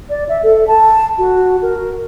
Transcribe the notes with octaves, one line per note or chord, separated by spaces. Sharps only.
D5
E5
A4
A5
F#4
A#4